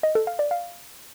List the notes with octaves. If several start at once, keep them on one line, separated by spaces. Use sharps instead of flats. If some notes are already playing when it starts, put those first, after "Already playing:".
D#5
A4
F5
D5
F5